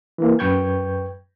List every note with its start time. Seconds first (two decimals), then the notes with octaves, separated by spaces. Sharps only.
0.18 E3 A#3
0.39 F#2 B4 G5 C#6 G6 G#6